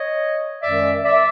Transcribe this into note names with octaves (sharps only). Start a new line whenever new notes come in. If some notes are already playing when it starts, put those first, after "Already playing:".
Already playing: C#5 D#5
F#2 D#3 G#3 D5 E5
D5 E5